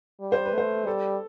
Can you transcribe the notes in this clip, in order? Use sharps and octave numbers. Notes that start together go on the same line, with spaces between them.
G3
C5
B4
A3 C5
G3 A4